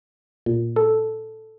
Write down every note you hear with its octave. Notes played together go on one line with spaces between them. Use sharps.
A#2
A4